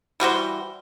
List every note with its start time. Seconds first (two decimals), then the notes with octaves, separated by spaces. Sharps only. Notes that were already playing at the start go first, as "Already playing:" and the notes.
0.20 E3 G3 F#4 C5